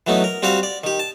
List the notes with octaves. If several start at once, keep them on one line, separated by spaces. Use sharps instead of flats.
E3 F#3 A3 B3 D#4
A#4
G3 C4 F#4 G4 F5
D5
D#3 G4
A5